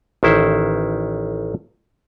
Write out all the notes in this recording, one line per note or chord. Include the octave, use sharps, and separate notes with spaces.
A1 D#3 E4 C5